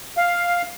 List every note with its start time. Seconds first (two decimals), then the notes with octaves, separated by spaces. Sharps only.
0.17 F5